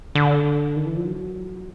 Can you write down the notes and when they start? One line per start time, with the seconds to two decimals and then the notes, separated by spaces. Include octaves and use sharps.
0.15 D3
0.76 D#3
0.86 E3
0.97 F3
1.06 F#3